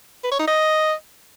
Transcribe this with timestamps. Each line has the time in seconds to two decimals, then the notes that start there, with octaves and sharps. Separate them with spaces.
0.23 B4
0.31 C#5
0.39 D#4
0.47 D#5